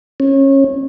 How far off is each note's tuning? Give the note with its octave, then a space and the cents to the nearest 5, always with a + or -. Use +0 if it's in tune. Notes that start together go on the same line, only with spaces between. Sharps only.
C#4 -25